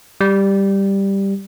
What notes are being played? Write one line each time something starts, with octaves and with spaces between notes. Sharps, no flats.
G3